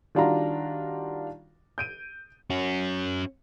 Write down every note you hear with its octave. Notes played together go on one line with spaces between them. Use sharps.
D#3 G3 D4 F4 F#4 A#5
G6 D7 D#7
C#4 F#4